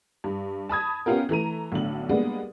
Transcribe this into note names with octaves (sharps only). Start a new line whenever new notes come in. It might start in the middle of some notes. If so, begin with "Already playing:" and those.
G2
A5 B5 D#6 G#6
B3 C#4 F4 G4 A#4
E3 A3 A#5 D#7
B1 A2 D3 F#7
G3 G#3 A#3 B3 D4